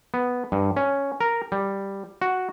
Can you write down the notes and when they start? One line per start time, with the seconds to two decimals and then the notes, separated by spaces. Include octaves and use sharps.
0.14 B3
0.52 G2
0.77 C#4
1.21 A#4
1.52 G3
2.22 F#4